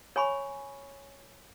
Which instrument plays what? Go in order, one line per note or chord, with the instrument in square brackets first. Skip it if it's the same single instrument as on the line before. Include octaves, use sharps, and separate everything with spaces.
[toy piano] C#5 G#5 B5 C#6